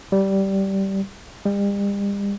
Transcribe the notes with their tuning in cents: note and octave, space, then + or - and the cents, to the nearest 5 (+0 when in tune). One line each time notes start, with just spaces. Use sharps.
G3 -15
G3 +40